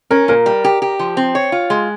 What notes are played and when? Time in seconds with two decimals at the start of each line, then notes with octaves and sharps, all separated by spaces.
0.10 C#4 A#4
0.28 A#2 A#4
0.46 G3
0.64 G4
0.82 G4
0.99 F3
1.17 C4
1.35 C#5
1.52 F4
1.70 G#3